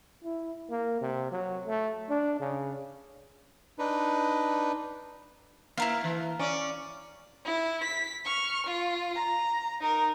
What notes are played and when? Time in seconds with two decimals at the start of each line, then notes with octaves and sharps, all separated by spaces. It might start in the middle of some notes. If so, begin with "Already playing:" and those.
0.24 E4
0.70 A#3
1.01 C3
1.31 F#3
1.67 A3
2.10 D4
2.40 C#3
3.79 D4 D#4 B4
5.77 A#3 E4 A#4 F5
6.04 E3
6.39 C#4 D5
7.45 E4
7.84 B6
8.24 C#6 F6
8.67 F4
9.15 A#5
9.80 D#4 A#4